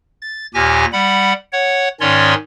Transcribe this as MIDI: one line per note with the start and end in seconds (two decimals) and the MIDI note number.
0.22 0.47 93
0.54 0.85 39
0.54 0.85 46
0.54 0.85 67
0.54 0.85 80
0.54 0.85 94
0.93 1.33 55
0.93 1.33 78
0.93 1.33 83
1.53 1.88 73
1.53 1.88 78
2.00 2.34 44
2.00 2.34 51
2.00 2.34 61
2.00 2.34 73
2.00 2.34 74
2.00 2.34 84